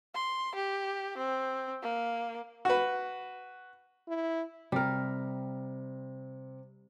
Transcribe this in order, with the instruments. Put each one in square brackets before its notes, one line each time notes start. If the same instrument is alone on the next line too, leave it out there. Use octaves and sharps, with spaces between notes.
[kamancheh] C6
G4
C4
A#3
[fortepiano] F#4 B4
[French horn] E4
[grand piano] C3 C4 [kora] G3 A#4